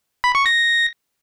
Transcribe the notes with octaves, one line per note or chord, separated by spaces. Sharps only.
B5
C#6
A#6